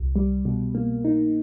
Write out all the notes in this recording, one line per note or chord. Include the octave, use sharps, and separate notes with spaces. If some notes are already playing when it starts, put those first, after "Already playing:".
Already playing: C2
G3
B2
A#3
D#4